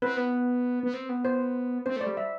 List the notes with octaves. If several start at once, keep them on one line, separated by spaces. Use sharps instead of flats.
C4 B4
B3
B3
C4
B3
C5
C4 C5
A3
D5
G3
E5